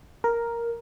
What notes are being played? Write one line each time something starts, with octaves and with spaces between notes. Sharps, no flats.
A#4